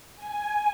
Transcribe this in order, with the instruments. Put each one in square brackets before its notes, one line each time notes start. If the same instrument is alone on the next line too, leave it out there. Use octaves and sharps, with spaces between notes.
[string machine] G#5